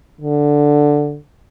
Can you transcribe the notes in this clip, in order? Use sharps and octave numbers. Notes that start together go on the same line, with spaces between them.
D3